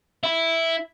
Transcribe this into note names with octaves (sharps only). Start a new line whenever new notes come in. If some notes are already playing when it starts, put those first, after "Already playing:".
E4